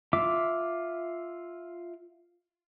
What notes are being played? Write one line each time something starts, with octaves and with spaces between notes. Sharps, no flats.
F4 E5 D6